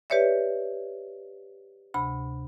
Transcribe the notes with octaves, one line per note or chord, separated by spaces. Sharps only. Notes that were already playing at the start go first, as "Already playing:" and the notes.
G4 B4 C#5 D5 E5
D2 C3 B5